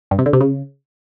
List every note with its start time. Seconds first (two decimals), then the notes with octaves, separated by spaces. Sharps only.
0.11 G2
0.19 C3
0.26 D3
0.33 C3
0.41 C#3